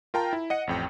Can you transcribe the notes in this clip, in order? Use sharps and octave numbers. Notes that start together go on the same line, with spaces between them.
F4 A#4 G5 A5 A#5
E4
D#5 F#5 C#7
A1 F2 G5